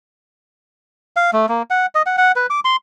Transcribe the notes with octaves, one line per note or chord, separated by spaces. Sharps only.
F5
A3
A#3
F#5
D#5
F#5
F#5
B4
D6
C6